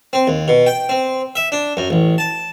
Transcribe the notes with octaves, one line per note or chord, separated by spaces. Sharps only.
C4
D#2
B2
G5
C4
E5
D4
F#2
A1
A5